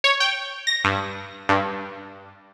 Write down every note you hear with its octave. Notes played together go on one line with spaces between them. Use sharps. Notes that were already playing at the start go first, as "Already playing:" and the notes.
C#5
G5
A#6
G2
G2